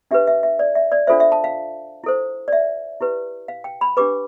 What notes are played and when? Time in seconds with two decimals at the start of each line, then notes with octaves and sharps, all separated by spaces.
0.11 D4 G4 B4 E5
0.27 E5
0.43 E5
0.59 D5
0.75 E5
0.92 D5
1.07 D4 F4 A4 C5 E5
1.20 E5
1.32 A5
1.44 F5
2.04 E4 A4 C5
2.48 D5
2.53 E5
3.01 E4 G4 B4
3.48 F5
3.64 G5
3.81 B5
3.97 D4 G4 B4 D6